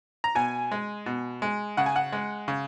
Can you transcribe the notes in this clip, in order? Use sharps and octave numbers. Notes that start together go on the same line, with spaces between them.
A#5
B2 G#5
G#3
B2
G#3
C#3 F#5
G#5
F#5
G#3
C#3